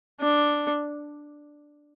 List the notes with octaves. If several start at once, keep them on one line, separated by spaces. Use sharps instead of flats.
D4